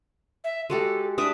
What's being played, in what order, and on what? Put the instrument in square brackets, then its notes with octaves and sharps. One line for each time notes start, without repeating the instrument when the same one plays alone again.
[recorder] E5
[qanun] G#3 F#4 G4 [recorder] A4
[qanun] D4 E5 D6 [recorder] D#6